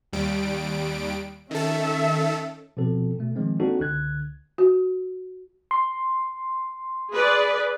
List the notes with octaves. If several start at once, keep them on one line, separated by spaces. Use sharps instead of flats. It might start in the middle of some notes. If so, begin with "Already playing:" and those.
D#2 G3 D7
D#3 C#4 A4 E5
B2 F3 C4 A4
B2 A3
D#3 F3 G#3 C4
A#3 C4 D4 D#4 F#4 A4
C#2 D3 F#6 G#6
F#4
C6
G#4 B4 D5